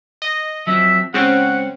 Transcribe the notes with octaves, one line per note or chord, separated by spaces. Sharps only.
D#5
F3 F#3 C4 E5
C#3 G#3 C4 C#4 F#5